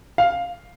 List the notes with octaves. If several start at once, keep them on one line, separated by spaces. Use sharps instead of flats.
F5